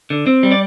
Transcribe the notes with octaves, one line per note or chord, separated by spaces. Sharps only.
D3
C4
G3
D5